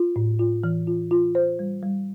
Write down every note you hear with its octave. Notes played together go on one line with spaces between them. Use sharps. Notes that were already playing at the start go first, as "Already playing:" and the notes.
Already playing: F4
A2
F4
E3
F4
F4
C5
G3
G3